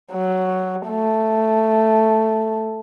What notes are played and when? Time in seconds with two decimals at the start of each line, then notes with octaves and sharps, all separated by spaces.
0.13 F#3
0.88 A3